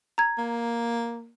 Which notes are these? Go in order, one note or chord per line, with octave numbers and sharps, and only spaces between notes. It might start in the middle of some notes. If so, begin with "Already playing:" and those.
A#5 G#6
A#3